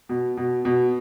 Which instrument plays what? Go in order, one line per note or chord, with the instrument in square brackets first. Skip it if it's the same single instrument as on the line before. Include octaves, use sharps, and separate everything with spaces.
[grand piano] B2
B2
B2